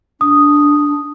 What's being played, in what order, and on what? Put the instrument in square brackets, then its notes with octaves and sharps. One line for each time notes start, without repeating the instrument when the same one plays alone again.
[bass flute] D4 [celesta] D#6